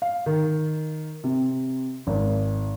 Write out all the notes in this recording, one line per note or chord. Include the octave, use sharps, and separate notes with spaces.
F5
D#3
C3
G#1